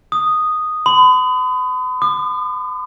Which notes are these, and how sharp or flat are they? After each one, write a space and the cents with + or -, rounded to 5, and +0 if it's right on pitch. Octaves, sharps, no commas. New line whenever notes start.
D#6 -5
B5 +45
D#6 -45